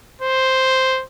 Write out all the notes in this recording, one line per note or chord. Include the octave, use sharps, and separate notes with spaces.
C5